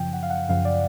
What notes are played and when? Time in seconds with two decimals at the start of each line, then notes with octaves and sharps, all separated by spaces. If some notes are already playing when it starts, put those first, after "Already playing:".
Already playing: F#2 C#3 F3 G5
0.13 F#5
0.23 F5
0.30 F#5
0.49 F#2 C#3 F3 F5
0.65 D5